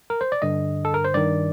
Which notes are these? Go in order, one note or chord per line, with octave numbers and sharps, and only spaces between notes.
A#4
C5
D5
G2 D3 D#5
A4
A#4
C5
G2 D#3 D5